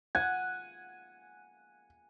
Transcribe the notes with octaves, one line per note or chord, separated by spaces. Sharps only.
F#5 G#5 G#6